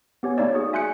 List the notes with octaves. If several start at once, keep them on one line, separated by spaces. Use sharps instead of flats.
B3 G4 C#5 G#5
A3 A#3 D#4 C#5 D5 E6
D#4 F#4 G#4
E5 G#5 C6 F#6 G6 C#7